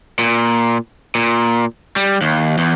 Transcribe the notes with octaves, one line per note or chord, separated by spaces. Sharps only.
A#2
A#2
G3
D#2
E2